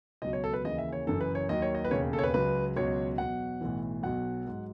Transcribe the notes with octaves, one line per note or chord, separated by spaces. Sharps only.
C#2 B2 F#3 D#5
C#5
A4
B4
D#2 C#3 E3 D#5
E5
C#5
F#1 F#2 E3 A4
B4
C#5
D#2 D#3 F#3 D#5
C#5
D#5
B4
E1 D#2 C#3 C#5
A4
C#5
B4
C#2 C#3 F#3 B4
C#2 B2 F#3 C#5
E2 B2 F#3 F#5
B1 A2 E3
B1 B2 F#3 F#5
G#2 F#3